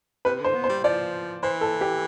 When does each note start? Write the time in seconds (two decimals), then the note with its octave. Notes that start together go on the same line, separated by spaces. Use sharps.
0.25 C3 B4
0.40 D3 C5
0.54 B3
0.64 C5
0.69 G3
0.84 F3 D5
1.43 E3 C5
1.61 A4
1.81 G4